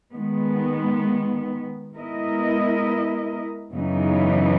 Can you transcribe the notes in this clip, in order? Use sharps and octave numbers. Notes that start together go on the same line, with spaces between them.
D#3 G#3 B3
G#3 B3 E4 A#4 D#5
F#2 C#3 E3 B3 D#4